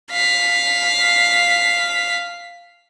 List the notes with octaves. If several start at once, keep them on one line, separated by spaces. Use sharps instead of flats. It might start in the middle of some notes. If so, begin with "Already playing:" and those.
F5 B6